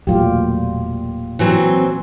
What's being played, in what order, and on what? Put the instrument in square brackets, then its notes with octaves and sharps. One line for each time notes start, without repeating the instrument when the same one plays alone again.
[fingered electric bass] E1 F#3 A3 [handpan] A#2 F4 G4
[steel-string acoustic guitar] E3 F#3 C4